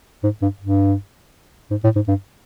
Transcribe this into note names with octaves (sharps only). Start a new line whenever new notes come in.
G#2
G2
G2
G#2
A2
G#2
G2